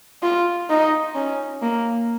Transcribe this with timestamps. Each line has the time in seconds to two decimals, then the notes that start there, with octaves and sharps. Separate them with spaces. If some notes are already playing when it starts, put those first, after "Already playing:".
0.23 F4
0.70 D#4
1.16 C#4
1.63 A#3